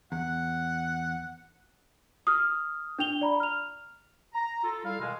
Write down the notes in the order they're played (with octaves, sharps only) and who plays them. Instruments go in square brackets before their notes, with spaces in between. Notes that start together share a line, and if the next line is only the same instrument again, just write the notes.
[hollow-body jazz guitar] E2 [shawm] F#5
[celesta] D#6 F6
D4 G5 F7 G7
D5 A#5 B5
F6 F7
[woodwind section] A#5
F4 A4
G3 E4 A4 F5
B2 D#3 G#3